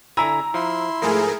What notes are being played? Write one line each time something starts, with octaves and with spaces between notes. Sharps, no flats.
D3 E4 G#5 A#5 E6
F3 E4 C6
G#2 F3 A3 G#4 A#4